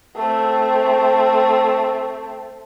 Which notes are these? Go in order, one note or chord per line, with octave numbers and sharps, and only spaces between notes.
A3 C4